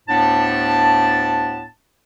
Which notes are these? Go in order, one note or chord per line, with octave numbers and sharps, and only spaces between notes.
D2 A2 B3 D4 A5